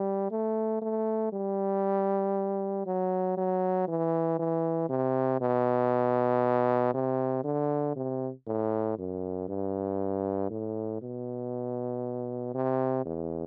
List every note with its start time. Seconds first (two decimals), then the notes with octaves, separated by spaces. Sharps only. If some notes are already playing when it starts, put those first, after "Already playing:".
Already playing: G3
0.31 A3
0.82 A3
1.33 G3
2.86 F#3
3.38 F#3
3.87 E3
4.39 E3
4.89 C3
5.41 B2
6.94 C3
7.44 D3
7.96 C3
8.47 A2
8.98 F#2
9.49 G2
10.50 A2
11.02 B2
12.55 C3
13.06 E2